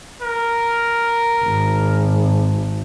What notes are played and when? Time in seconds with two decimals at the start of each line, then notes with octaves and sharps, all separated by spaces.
0.22 A#4
1.44 G#1